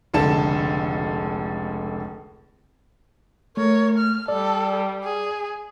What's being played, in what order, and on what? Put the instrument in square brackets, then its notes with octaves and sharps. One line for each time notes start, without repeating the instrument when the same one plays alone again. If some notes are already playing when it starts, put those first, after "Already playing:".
[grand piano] F1 C#2 D3 A4 A5 E7
[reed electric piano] A3 [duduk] A#4 [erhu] C#5
[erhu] F6
[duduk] G3 [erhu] A4 [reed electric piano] D5
[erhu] G#4